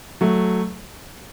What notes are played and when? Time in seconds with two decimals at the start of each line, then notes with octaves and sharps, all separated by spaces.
0.21 F#3 A3